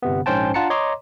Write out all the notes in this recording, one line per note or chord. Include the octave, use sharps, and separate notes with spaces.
G1 C3 B3
A#1 G#2 C#4 C5 G5 A5
D4 F4 F#5 A5 A#5 C#7
C#5 D#5 A#5 C6 D6